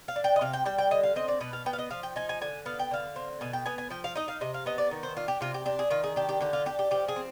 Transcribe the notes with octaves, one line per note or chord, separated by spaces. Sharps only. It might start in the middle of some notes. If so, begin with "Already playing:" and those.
F5
D4
G5
D#5
C3 F5
G5
G3 G5
G5
D3 D#5
F5
C4 D#5
D5
B2 B4
F5
B3 G5
F5
D#5
F3 F5
G5
D#4 G#5
G#5
D3 G#5
B3 F5
G5
D3 F5
C4
B2 G#5
G5
B3 G#5
G#5
F3 G5
F5
D#4 D#5
F5
C3 D#5
F5
B3 D#5
D5
D#3
C5
D4 F4
G4
C3 F4
G4
D4 G4
G#4
D#3 F4
G#4
D4 G4
G4
D3 G4
F4
D4 G4
G4
F3 G4
G#4
C4